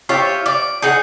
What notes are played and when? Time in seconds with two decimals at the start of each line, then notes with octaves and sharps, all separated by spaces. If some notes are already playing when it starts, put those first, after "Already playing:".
0.09 F4 G4 C#5 E5
0.46 D5
0.82 D#4 G#4 F#5